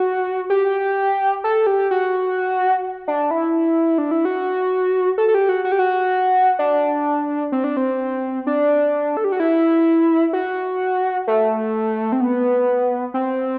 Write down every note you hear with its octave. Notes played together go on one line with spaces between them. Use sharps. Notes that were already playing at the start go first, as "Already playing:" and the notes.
Already playing: F#4
G4
A4
G4
F#4
D4
E4
D4
E4
F#4
A4
A4
G4
F#4
F#4
G4
F#4
D4
C4
D4
C4
D4
A4
G4
F#4
E4
F#4
A3
C4
B3
C4